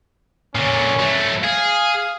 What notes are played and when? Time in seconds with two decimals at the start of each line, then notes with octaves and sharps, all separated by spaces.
0.55 A#2 D3 C#4
0.99 F#3 A3
1.44 G#4 F5